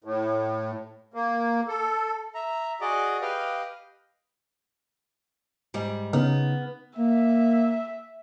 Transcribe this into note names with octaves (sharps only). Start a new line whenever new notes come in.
A2
A#3
A4
E5 A#5
F#4 G#4 D5 D#5 D6
G4 B4 D#5 F5
G#2 G3
C#3 B3 D#4 F6
A#3 E5